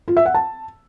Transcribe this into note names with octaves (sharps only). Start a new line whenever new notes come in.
F4
E5
F#5
A5